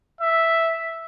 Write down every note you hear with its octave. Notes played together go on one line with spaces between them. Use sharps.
E5